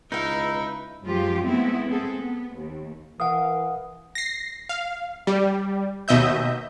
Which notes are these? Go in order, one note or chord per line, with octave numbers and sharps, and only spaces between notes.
C#2 D#4 E4 B4 F5
F#2 F3 G#3 F4 G4
G#3 A3 B3 C4 E4
B3 C4 G#4 A4
B3
D#2
E3 A#4 F5 F#5 D#6
A#6 C7
F5
G3
D#2 B2 D#5 E5 G6